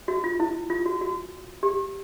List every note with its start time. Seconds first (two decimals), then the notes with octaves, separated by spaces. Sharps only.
0.08 F#4
0.24 F4
0.40 E4
0.70 F4
0.86 F#4
1.01 F#4
1.63 G4